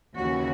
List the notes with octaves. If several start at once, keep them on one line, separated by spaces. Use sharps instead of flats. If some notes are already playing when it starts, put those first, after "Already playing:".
D#2 C#3 E3 F#4